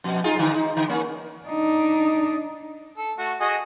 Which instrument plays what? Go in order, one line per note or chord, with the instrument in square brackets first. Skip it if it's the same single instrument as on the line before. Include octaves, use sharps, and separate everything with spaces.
[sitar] F2 B2
D#4 F4 G#4
G#2 D3
D#4
D3
A#3 C#4
[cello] D4 D#4
[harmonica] A4
A3 F#4
F#4 G#4 D#5